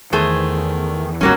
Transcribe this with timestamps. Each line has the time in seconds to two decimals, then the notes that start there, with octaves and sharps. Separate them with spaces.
0.13 E2 D#3 A3 G#4 C5
1.21 D1 G#1 F#3 G3 A#3 C#4